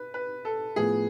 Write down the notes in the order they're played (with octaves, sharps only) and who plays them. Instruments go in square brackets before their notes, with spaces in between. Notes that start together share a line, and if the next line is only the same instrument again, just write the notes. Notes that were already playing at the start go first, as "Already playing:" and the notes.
Already playing: [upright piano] B4
B4
A4
[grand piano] A2 F3 B3 [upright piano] G#4